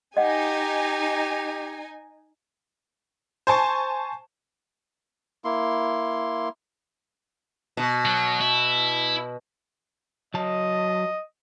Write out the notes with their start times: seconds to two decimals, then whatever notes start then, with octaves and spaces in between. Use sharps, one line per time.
0.17 D#4 G4 D#5 F#5 G#5
3.47 C5 G#5 A5 C#6
5.44 A#3 E4 C6
7.77 B2
8.05 F#3
8.41 E4
10.34 F#3 D#5 A5